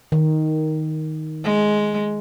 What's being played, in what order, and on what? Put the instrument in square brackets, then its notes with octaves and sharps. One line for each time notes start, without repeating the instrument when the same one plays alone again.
[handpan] D#3
[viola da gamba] G#3